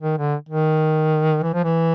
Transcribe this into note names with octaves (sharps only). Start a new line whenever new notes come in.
D#3
D3
D#3
E3
F3
E3